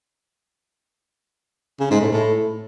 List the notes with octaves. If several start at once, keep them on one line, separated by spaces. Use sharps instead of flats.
C#3
G#2
A2
A2